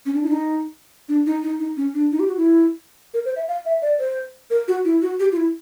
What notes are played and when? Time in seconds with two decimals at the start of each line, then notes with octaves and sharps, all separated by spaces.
0.06 C#4
0.14 D4
0.23 E4
0.27 D4
0.32 D#4
1.09 D4
1.26 D#4
1.43 D#4
1.59 D#4
1.77 C#4
1.94 D4
2.12 D#4
2.20 G4
2.28 F#4
2.37 E4
3.14 A#4
3.25 C5
3.36 E5
3.48 F5
3.66 E5
3.82 D5
3.99 C5
4.50 A#4
4.68 F#4
4.85 E4
5.02 F#4
5.20 G4
5.32 F4
5.37 E4